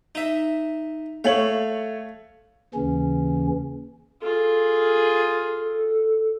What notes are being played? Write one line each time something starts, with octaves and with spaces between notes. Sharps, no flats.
D#4 E5
A3 C#5 F5 F#7
D#2 C#3 E3 C#4
F4 G#4 A4